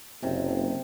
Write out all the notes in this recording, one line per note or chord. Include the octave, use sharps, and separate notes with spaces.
F#1 C3